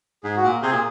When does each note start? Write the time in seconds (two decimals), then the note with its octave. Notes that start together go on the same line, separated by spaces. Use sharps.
0.24 G#2 G#4
0.37 F#4
0.44 A#2
0.63 C3 G#4
0.73 A#2